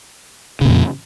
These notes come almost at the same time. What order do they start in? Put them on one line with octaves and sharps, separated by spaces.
C#3 A#2 F2